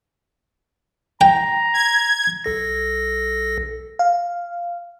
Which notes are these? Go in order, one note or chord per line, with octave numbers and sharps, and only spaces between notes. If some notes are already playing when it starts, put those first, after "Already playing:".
G5 A#5
G#6
B1 A4 A#6
F5